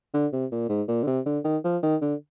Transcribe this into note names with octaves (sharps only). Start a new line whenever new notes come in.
D3
C3
A#2
G#2
A#2
D3
C3
D3
D#3
F3
D#3
D3